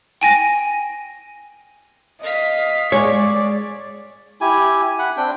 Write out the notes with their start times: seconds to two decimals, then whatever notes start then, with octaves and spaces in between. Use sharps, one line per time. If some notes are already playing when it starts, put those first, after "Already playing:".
0.21 G5 G#5 A#6
2.23 D#5 F5 B6
2.92 G#3 C#5 D5
4.41 E4 G4 G#5
4.99 F#5 B5
5.17 C4 D4 G5